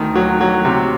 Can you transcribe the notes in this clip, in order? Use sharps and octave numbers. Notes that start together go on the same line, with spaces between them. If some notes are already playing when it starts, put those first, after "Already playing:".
Already playing: D2 D#3
F#3
F#3
C3